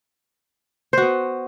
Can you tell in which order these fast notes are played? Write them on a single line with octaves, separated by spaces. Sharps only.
C5 F#4 B3